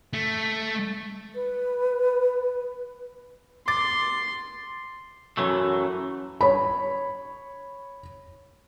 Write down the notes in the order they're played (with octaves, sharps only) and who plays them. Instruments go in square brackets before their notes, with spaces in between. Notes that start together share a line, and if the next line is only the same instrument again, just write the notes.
[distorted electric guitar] A3
[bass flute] B4
[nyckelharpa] C6 [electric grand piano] D6 A6
[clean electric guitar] F#2 E3 F#3 A3
[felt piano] C#5 B5